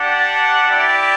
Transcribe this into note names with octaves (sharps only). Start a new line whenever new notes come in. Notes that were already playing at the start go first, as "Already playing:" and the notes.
Already playing: D4 G4 D5 F#5
E4 G4 D5